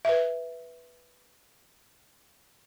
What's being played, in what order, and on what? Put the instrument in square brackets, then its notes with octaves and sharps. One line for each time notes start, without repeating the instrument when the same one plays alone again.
[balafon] B4 E5